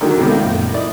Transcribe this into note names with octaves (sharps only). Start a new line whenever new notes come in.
D3 D#3 F#3 A3 G#4 A#4
C#2 B2 D#3 C4
A3 F4
F#2 A#2
E4 D5 D#5